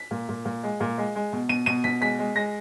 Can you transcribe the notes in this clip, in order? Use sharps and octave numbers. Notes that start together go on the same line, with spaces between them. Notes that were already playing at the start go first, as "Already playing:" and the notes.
Already playing: B6
A#2
A#2
A#2
G#3
A#2
G#3
G#3
B2
B2 D#7
B2 D#7
B2 B6
G#3 B6
G#3
G#3 A#6